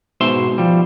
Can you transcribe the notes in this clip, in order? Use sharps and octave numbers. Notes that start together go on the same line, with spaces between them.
G#2 B2 C5 E5 C6
F3 G3